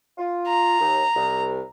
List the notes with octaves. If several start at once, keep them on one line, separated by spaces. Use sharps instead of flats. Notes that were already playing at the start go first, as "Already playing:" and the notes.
F4
A#5
D#2
C2